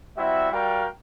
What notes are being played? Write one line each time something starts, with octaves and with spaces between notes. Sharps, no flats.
G3 C4 E4 F#4 E5
G3 F#4 A#4 F5 G5